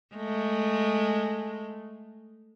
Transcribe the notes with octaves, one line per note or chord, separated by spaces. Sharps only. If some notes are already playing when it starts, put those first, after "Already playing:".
G#3 A3